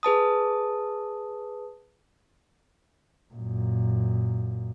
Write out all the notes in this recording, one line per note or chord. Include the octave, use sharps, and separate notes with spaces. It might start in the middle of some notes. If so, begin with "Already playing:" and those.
G#4 B4 A5 D#6
F#2 A#2